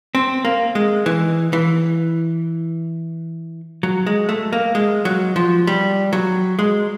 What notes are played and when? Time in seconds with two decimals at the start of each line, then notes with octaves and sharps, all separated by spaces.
0.15 C4
0.45 A#3
0.75 G#3
1.06 E3
1.53 E3
3.83 F#3
4.07 G#3
4.29 A3
4.53 A#3
4.75 G#3
5.05 F#3
5.36 F3
5.67 G3
6.13 F#3
6.59 G#3